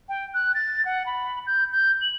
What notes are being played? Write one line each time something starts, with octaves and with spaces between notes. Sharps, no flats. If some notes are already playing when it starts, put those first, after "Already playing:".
G5
F#6
A6
F#5
B5
G6
G6
F#7